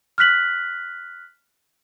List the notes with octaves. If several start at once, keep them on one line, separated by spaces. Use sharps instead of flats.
F6 F#6 B6 F#7